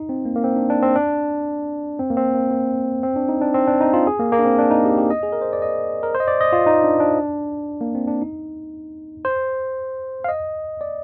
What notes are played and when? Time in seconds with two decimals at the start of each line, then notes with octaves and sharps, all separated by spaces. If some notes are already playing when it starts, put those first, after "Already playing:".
Already playing: D#4
0.09 C4
0.25 A#3
0.36 A#3
0.44 C4
0.56 D4
0.70 D4
0.82 C4
0.96 D4
1.99 C4
2.10 A#3
2.17 C4
2.34 A#3
2.51 A#3
3.03 C4
3.16 D4
3.29 D#4
3.41 D4
3.54 C4
3.67 D4
3.81 D#4
3.93 F4
4.07 G#4
4.19 A#3
4.32 A#3
4.39 D4
4.45 C4
4.59 D4
4.71 D#4
4.85 G4
4.98 G4
5.10 D#5
5.23 G#4
5.32 A#4
5.42 C5
5.53 D5
5.62 D#5
6.03 A#4
6.15 C5
6.20 D#5
6.28 D5
6.41 D#5
6.53 F4
6.66 D#4
6.84 D4
7.00 D4
7.81 A#3
7.95 C4
8.08 D4
8.22 D#4
9.25 C5
10.24 F5
10.28 D#5
10.81 D5